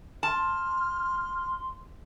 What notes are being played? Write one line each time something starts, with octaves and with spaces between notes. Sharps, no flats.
A5 C6 F6